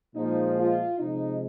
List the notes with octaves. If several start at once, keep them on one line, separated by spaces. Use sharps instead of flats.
A#2 F3 G#3 D#4
F4
C3 F3 G#3 D#4